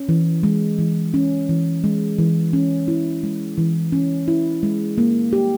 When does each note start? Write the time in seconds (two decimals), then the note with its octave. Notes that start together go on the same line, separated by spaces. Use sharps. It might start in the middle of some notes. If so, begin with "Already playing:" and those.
Already playing: C#4
0.09 E3
0.43 G#3
0.79 E3
1.14 C#4
1.49 E3
1.84 G#3
2.18 E3
2.53 C#4
2.88 E4
3.24 G#3
3.58 E3
3.92 C#4
4.28 E4
4.63 G#3
4.98 A#3
5.33 G4